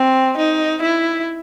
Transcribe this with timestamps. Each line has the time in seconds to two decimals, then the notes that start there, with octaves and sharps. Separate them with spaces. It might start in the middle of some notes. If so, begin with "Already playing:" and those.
Already playing: C4
0.38 D#4
0.82 E4